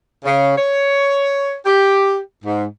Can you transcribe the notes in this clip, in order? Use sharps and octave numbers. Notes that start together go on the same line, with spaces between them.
C#3
C#5
G4
G#2